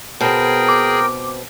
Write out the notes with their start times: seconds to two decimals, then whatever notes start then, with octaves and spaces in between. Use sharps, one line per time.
0.21 B2 C4 G#4 A#4 G5
0.69 D6